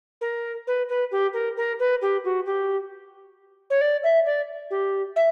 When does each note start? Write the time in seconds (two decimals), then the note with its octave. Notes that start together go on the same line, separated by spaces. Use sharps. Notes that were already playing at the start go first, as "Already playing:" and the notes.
0.21 A#4
0.67 B4
0.89 B4
1.11 G4
1.33 A#4
1.57 A#4
1.79 B4
2.02 G4
2.24 F#4
2.46 G4
3.70 C#5
3.81 D5
4.03 E5
4.26 D5
4.70 G4
5.16 E5